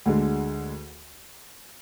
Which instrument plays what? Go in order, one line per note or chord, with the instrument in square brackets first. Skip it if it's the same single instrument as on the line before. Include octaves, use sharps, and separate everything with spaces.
[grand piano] D2 D3 G#3